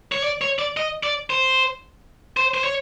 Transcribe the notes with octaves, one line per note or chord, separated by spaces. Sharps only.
C#5
D5
C#5
D5
D#5
D5
C5
C5
C5
C#5